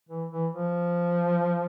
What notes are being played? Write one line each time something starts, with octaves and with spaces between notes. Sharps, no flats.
E3
E3
F3